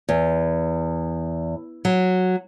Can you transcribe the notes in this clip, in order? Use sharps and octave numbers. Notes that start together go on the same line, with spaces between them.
E2
F#3